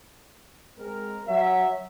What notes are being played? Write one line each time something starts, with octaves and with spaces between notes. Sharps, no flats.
G#3 C4 A#4
F#3 E5